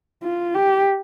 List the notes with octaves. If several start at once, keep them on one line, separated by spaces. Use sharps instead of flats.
F4
G4